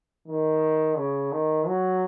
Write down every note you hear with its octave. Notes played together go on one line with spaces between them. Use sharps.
D#3
C#3
D#3
F#3